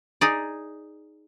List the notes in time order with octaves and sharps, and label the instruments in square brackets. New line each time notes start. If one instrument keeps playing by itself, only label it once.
[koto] D#4 G#4 D5